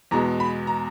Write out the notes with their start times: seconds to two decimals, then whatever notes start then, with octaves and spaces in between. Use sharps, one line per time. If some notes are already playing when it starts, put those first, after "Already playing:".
0.11 E2 B2 G#3 A#5
0.40 B5
0.67 A#5